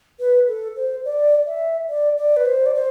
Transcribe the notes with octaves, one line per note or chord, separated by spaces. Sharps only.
B4
A4
C5
D5
E5
D5
D5
B4
C5
D5
C5